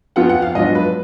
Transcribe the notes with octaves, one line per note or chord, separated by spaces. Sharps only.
F2 F3 B3 F4 F#5
F#5
F5
G#2 F#3 B3 D4 F4 D#5
B4